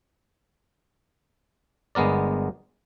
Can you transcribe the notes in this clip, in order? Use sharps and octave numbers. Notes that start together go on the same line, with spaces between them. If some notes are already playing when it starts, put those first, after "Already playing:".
G1 G#3 B3 A#4 D5